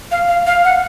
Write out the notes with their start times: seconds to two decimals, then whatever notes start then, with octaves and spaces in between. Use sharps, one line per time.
0.11 F5
0.28 F5
0.47 F5
0.65 F#5